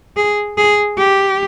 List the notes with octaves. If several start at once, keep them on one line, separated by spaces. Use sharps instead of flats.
G#4
G#4
G4